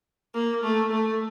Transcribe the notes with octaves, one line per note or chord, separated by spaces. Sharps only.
A#3
A3
A3